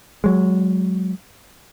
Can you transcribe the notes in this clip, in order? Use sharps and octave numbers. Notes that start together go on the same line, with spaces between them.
F#3 G#3